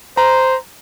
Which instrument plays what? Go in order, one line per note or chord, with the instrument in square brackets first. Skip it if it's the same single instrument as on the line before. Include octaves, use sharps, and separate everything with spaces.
[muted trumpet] C5 [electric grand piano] A#5